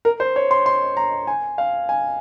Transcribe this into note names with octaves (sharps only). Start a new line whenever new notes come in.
A#4
C5
C#5
C6
C6
A#5
G#5
F5
G#5